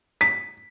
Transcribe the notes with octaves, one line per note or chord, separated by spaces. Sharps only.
B6